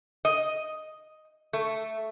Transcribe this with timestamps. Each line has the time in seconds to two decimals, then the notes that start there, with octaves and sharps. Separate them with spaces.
0.25 D#5
1.53 A3